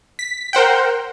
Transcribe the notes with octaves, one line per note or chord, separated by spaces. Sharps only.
B6
A#4 C5 F#5 G5